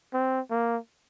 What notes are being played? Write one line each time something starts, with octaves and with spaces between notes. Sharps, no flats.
C4
A#3